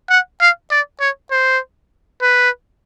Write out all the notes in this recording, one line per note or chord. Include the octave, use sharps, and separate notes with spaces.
F#5
F5
D5
C#5
C5
B4